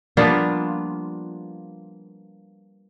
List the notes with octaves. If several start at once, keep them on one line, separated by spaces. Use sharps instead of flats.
F3 G3 A#3 B3 D4 F4